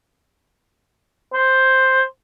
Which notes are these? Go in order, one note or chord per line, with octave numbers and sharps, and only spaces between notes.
C5